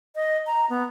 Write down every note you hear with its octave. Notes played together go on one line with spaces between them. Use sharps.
D#5
A#5
B3